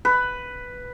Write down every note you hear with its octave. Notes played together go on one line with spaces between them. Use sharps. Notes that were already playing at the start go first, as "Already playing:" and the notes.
B4